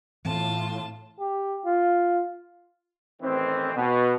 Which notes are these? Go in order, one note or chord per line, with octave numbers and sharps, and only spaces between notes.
A2 E3 B3 C4 F4 A5
G4
F4
A1 D#3 E3 C4
B2